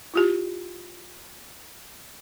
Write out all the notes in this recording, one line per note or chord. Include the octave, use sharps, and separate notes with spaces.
E4 F4 G4